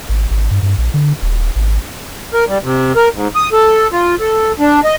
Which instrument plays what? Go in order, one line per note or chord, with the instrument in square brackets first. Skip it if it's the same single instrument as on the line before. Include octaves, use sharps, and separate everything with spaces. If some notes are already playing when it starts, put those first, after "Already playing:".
[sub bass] G#1
G#1
G2
G2
A#1
D3
D#1
G#1
[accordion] A#4
G3
C3
A#4
G#2
D#6
A4
F4
A4
D4
D#5